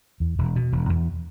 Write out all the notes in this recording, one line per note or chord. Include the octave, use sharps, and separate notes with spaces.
E2
E1
B2
E1
E2